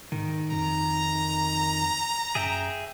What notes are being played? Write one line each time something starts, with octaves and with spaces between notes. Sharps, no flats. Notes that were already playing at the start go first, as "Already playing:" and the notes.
G#2 D#3
F2 A#5
F#2 G#4 E5 G5